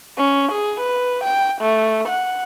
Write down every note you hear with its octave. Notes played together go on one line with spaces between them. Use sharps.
C#4
G#4
B4
G5
A3
F#5